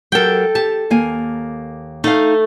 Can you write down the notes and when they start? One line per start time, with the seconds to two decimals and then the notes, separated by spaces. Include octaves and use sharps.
0.12 F#3 G4 A4 A#4 G5
0.55 G4 A5
0.90 D#2 A#3 G#5
2.04 A3 D#4 F5